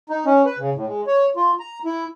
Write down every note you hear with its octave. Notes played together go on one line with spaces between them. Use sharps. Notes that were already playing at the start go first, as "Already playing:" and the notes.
D#4
C#4
B4
C#3
A2
G#3
C#5
F4
A#5
E4